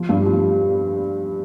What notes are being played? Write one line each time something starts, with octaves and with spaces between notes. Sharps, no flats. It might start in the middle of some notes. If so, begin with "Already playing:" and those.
Already playing: F3
G2 G3
F3